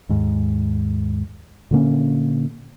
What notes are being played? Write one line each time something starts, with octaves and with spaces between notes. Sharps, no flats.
D#2 G#2
A#2 D3 A#3 C#4